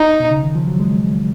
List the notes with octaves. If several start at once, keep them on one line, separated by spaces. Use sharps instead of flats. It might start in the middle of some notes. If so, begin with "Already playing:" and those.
Already playing: D#4
B2
C#3
D#3
F3
F#3
G#3